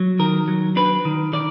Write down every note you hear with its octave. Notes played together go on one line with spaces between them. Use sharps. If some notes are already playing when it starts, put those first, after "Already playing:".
Already playing: F#3
D#3 A#4
F#3
D4 B4
D#3
D#3 D5